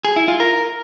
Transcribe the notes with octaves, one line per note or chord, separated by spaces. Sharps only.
G#4
E4
F4
A#4